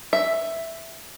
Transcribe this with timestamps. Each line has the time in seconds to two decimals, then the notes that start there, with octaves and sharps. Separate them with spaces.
0.13 E5